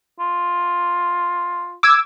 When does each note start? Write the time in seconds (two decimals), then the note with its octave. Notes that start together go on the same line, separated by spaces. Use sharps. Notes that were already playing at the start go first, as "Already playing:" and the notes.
0.20 F4
1.83 D6 E6 G#6